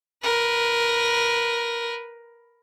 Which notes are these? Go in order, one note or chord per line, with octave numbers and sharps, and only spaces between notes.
A#4 B4